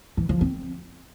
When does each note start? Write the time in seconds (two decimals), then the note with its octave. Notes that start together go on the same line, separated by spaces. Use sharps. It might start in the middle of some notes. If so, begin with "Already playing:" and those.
0.17 E3
0.29 F3
0.41 C4